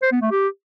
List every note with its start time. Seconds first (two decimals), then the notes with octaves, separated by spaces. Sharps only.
0.02 C5
0.12 B3
0.21 A3
0.31 G4